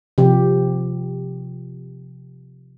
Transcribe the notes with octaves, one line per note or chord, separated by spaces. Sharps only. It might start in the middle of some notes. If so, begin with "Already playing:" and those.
C3 F3 G4